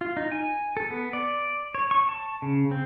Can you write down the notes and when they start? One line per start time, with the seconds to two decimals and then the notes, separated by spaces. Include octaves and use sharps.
0.01 F4
0.17 D#4
0.32 G#5
0.77 A4
0.90 B3
1.13 D5
1.75 C#5
1.91 C#6
2.09 A5
2.42 C#3
2.71 C4